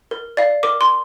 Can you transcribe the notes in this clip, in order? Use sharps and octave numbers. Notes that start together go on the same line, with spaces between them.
A#4
D5 F5
A#4 D6
C6